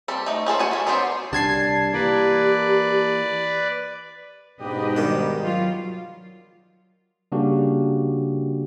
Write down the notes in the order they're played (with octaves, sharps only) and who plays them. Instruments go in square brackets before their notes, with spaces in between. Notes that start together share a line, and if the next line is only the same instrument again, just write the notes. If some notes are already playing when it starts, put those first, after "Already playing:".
[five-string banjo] G3 C4 A4
A3 D#4
C#4 G#4 A4 C5
F#4 F#5 G#5 A5
C#4 D4
F#3 B3 C4 D4 C5
[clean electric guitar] C2 G3 D4 [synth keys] A5 G#6 C7
[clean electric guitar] E3 A#3 A#4 [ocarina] G4 [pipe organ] B4 D5
[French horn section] G#2 B2 [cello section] D4 B4 D#5 [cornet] G4
[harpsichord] D#3 G3
[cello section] F#3 F4 F5
[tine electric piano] C#3 G3 A#3 D4 F#4 G4